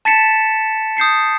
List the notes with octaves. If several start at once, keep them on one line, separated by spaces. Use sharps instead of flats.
A5 A6 B6 C#7 E7
D#6 G6 C7 C#7